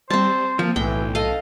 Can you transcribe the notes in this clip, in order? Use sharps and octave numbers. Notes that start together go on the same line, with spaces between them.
G3 C4 C5 A5
F3 A#3
B1 A2 E3 G5
A4 D#5 F5